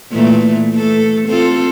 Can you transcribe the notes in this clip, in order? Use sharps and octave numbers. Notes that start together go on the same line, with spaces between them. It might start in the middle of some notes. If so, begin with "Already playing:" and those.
A#2 E3 A3
A3 A4
C4 F4 A4